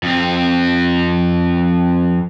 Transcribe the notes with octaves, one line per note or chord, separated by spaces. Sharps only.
F2 C4